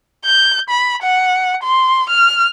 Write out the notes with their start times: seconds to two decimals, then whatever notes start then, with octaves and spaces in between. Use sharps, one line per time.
0.25 G6
0.69 B5
1.03 F#5
1.63 C6
2.09 F6